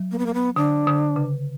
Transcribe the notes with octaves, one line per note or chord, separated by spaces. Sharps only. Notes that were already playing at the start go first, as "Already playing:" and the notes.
Already playing: F#3
A#3
B3
A#3
B3
D3 D4
D3
C#3